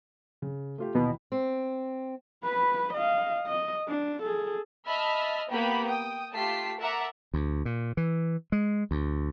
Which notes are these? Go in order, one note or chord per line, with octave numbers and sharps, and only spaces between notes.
C#3
A3 F4 G4
D#2 B2 E3 B5
C4
B4 B5
D#5 F5
D#5
D4
G#4 A4
D#5 E5 A5 B5 F6
A#3 B3 G4 B5
G5 D#6
A3 F4 G4 A5 B6 C7
A#4 E5 F#5 A5 A#5 D6
D2
A#2
E3
G#3
D2